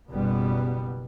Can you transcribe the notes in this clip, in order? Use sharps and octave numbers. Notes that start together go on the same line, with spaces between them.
F#1 B2 G3 B3